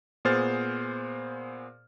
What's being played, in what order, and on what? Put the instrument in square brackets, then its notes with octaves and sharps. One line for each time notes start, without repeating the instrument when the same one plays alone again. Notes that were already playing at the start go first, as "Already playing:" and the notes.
[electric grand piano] A#2 B3 G#4 C5 F6 A6